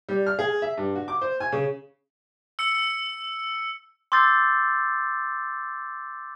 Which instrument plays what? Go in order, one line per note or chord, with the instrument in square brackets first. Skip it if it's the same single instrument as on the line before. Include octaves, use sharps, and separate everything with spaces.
[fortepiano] G3
F6
G#4
E5
G2
F#4
D6
C5
G#5
C#3
[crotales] E6 C#7
[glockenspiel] C6 D6 E6 G6 A6 C7